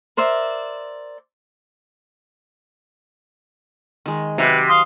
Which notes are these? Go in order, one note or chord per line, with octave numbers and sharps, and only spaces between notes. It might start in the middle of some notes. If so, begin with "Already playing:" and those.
A#4 C5 D5 E5
D#3 G#3
C3 F#3 F#4 G4 B4
F5 C6 D#6